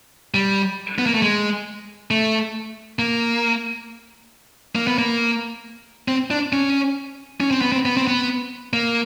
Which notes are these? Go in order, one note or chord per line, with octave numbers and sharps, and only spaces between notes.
G3
B3
A#3
A3
G#3
A3
A#3
A#3
B3
A#3
C4
D4
C#4
C#4
C4
B3
C4
B3
C4
B3
A#3